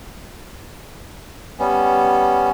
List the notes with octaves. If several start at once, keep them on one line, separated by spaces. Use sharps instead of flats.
G3 B3 C#4